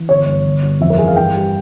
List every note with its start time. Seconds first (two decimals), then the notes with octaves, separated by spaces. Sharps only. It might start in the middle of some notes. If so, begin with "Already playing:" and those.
Already playing: E3
0.09 G1 C#5
0.27 G2
0.45 G1
0.63 G2
0.80 F2 E5
0.90 A#4
0.98 E3 G#4
1.08 F5
1.16 G2 G5
1.34 G3